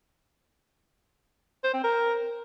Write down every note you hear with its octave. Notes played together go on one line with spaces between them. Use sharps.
C5
C4
A#4